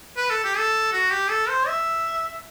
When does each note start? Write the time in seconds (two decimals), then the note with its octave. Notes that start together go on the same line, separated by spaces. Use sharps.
0.17 B4
0.30 A4
0.44 G4
0.57 A4
0.93 F#4
1.11 G4
1.30 A4
1.48 C5
1.68 E5